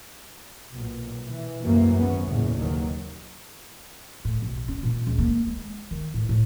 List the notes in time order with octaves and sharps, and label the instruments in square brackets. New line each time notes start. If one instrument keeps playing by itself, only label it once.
[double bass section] B1 A#2
E3
C2 F#2 E3 A3 A#3
G#1 B3 C#4
A1 E2 A#2 C#3
F#1 D#2 B2 D#3 F#3
[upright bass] A2
B1
C#4
A#2
C#2
A#3
G#3
D#3
A2
A2